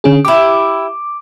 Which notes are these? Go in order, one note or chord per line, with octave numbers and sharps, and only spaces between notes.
D3 C#4 G#4
E4 G4 D6